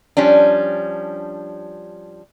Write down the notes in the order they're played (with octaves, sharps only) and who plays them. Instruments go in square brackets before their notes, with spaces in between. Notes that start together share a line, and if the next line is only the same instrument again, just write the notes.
[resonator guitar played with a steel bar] F3 G3 C#4 D4